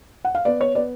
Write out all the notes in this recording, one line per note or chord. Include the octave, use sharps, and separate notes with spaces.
F#5
F5
B3 D5
C#5
B3 D5